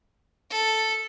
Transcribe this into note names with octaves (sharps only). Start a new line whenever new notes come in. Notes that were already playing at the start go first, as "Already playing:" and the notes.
A4